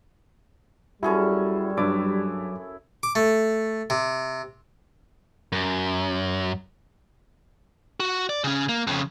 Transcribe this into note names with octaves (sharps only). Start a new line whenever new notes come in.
F#2 G3 E4 F#4 G#4 A4
G2 F#3 E4 D6
D6
A3
C3
F#2
F#4
D5
C#3 C#4
A#3
F2 C#3